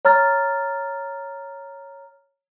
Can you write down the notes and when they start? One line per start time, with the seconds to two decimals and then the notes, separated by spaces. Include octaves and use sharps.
0.05 C#5 A#5 F6 A6